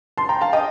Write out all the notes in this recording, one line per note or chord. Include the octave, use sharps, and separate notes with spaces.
A5 C6
G5 A#5
F5 A5
D#5 G5